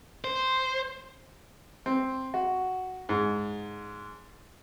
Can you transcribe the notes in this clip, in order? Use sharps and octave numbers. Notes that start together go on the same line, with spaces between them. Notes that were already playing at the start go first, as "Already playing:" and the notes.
C5
C4
F#4
G#2